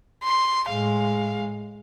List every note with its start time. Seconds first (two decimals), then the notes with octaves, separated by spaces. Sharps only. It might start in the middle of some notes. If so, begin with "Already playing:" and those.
0.23 C6
0.69 A2 G#3 F5